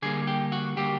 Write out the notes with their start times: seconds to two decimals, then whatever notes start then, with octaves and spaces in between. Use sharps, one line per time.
0.02 D3 G3 A#3 G#4
0.27 G4
0.52 F#4
0.77 D3 G3 A#3 G4